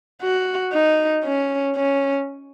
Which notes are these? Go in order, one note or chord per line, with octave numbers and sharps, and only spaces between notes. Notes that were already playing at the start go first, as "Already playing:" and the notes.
F#4
D#4
C#4
C#4